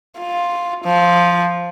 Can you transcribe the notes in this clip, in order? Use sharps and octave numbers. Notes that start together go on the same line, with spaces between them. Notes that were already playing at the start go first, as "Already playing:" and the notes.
F4
F3